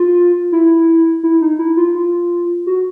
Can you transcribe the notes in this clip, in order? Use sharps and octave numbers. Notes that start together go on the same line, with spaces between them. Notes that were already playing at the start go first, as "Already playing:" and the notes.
Already playing: F4
E4
E4
D#4
E4
F4
F4
F#4